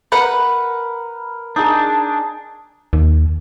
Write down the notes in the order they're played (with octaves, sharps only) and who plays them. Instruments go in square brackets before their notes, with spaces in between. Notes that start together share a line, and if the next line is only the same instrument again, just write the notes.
[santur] A#4 [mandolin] B4 F#5
[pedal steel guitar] D4 [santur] D#4 G#4
[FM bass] D#2